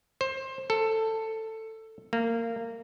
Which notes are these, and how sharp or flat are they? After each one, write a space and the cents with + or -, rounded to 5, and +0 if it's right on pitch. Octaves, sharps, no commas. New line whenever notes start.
C5 +20
A4 +10
A#3 -20